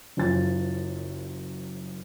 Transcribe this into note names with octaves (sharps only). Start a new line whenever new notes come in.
F#1 F#2 F3 A6